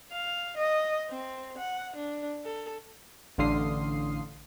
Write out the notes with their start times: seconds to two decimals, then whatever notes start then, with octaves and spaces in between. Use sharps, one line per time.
0.12 F5
0.57 D#5
1.10 C4
1.58 F#5
1.96 D4
2.44 A4
3.38 A1 D3 F5 C6 D#6 C7